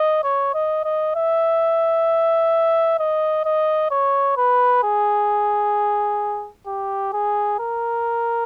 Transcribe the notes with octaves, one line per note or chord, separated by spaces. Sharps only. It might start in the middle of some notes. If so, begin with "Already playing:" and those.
Already playing: D#5
C#5
D#5
D#5
E5
D#5
D#5
C#5
B4
G#4
G4
G#4
A#4